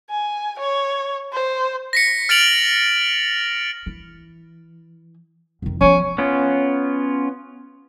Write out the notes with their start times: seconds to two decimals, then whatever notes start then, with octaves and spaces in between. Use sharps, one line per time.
0.10 G#5
0.59 C#5
1.33 C5
1.93 A#6 B6 C#7
2.29 F6 A6 C#7 D7 F7 F#7
3.86 E3
5.62 F2 D#3
5.81 F3 B3 C#4
6.18 B3 C#4 F4